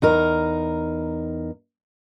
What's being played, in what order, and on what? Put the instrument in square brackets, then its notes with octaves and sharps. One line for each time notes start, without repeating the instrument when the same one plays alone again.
[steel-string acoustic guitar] E2 D#4 A#4